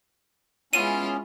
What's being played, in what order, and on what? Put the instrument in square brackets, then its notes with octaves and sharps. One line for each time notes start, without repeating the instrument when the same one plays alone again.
[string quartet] G#3 E4 F4 [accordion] B3 C#4 [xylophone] D#7